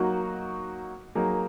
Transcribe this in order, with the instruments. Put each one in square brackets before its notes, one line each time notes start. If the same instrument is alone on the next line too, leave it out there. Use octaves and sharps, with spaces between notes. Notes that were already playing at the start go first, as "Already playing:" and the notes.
Already playing: [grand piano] F#3 A#3 D#4 F#4
F#3 A#3 D#4 G#4